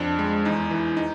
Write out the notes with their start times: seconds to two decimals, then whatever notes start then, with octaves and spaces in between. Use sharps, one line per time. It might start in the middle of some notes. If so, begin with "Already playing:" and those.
Already playing: F2 D4
0.19 G#3
0.45 E2 D#4
0.71 E3
0.97 D#4